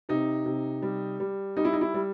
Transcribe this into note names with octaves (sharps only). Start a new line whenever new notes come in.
C3 D#4
C3
G3
G3
G3 D#4
E4
D#4
E4
G3